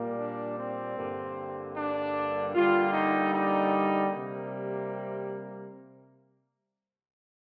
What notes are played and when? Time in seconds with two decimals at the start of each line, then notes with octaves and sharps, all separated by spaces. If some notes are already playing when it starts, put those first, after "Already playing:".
Already playing: A#2 G3 A#3
0.18 D4
0.58 C4
0.96 G2 D3 G3 A#3
1.75 D4
2.54 D3 G3 A#3 F4
2.93 D#4
3.33 D#4
4.12 C3 G3 A#3